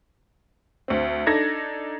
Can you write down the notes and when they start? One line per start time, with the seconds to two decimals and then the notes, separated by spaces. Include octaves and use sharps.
0.88 D2 C4
1.26 D4 D#4 A4 G#6 A#6